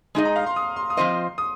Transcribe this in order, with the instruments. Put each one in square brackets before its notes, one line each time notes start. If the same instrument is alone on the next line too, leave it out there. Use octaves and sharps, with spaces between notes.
[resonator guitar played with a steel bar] G#3 D#4 G#4 D#5
[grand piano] A#5
F5
C6
D#6
C6
D#6
[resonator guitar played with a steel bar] F3 C4 F4 C5 D#5 [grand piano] C6
[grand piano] D#6